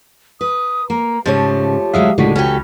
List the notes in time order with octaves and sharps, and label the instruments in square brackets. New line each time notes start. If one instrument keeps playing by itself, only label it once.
[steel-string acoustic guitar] B4 [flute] D#6
[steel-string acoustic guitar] A#3 [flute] A#5
[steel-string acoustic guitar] G#2 C#3 [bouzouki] F3 A3 C#5 [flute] G4
[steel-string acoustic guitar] D2 F#3 G#3 [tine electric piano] E5 F5 D#6
[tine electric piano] C#2 F#4 B6 [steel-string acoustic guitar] A2 D3 G#3
[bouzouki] E3 C#4 [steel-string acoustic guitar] G4 A4